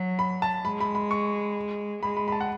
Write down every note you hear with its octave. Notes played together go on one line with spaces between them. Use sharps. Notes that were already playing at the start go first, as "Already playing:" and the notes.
Already playing: F#3
B5
A5
G#3 B5
B5
B5
C#6
G#3 B5
B5
B5
A5
F#5